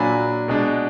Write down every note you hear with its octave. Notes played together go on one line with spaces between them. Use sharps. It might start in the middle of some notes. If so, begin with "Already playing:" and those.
Already playing: A#2 F#3 D4 G#5 B5
B2 G#3 D4